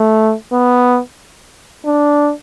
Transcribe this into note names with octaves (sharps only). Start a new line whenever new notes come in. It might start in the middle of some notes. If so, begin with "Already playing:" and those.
Already playing: A3
B3
D4